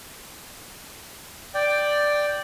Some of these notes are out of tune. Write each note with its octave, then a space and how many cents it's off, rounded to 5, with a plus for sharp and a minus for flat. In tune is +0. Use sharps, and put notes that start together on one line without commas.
D5 +5 G5 +0